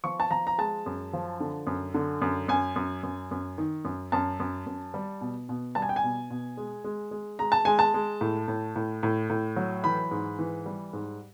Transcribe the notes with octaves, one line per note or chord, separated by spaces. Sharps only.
F3 C#6
A5
F3 A#5
A#5
G#3 A5
F#2
F3
D3
F#2
D3
F#2
F#2 G#5
F#2
F#2
F#2
D#3
F#2
F#2 A5
F#2
F#2
G3
B2
B2
G3 A5
G#5
G5
G#5
B2
B2
G#3
G#3
G#3
G#3 A#5
A5
G#3 G#5
A5
G#3
A2
A2
A2
A2
A2
F#3
E3 B5
G#2
E3
G3
G#2